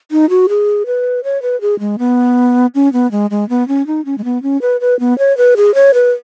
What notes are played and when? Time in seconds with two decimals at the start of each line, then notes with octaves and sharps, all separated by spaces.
0.12 D#4
0.29 F#4
0.49 G#4
0.86 B4
1.24 C#5
1.42 B4
1.61 G#4
1.80 G#3
1.99 B3
2.75 C#4
2.93 B3
3.11 G#3
3.30 G#3
3.49 B3
3.68 C#4
3.87 D#4
4.05 C#4
4.18 G#3
4.24 B3
4.43 C#4
4.62 B4
4.81 B4
5.00 B3
5.19 C#5
5.37 B4
5.57 G#4
5.74 C#5
5.94 B4